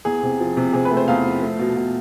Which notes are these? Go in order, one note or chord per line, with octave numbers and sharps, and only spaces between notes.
E2 G#4
C3
F3
C3
C3 G#4
B4
A3
C5
E2 F5
F3
A3
B2
B2